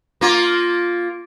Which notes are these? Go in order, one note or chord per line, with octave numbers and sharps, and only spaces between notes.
A#3 F4